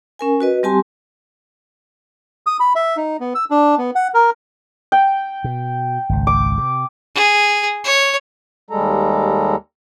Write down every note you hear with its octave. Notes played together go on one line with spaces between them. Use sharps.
C#4 A#4 G#5
F#4 B4 D#5
G3 C4 G4 G#5 A5 C6
D#6
B5
E5
D#4
B3
E6
D4
B3
F#5
A#4
G5
B2
G#1 C#2
D6
C3
G#4
C#5
D#2 G3 G#3 A4 A#5